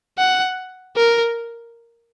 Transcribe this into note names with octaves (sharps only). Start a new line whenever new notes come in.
F#5
A#4